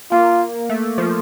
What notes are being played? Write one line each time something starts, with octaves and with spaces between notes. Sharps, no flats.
A#3 F4
A3
F3